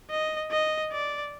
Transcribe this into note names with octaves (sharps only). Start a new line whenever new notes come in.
D#5
D#5
D5